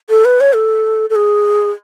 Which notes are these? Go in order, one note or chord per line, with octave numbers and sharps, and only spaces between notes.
A4
B4
C#5
A4
A4
G#4